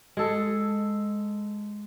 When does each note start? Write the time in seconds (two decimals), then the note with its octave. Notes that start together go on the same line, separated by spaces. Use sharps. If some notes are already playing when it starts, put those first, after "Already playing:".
0.17 G#3 A4